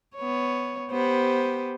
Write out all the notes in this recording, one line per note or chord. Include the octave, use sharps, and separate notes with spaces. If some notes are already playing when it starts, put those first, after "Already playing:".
B3 C#5
B3 G4 C5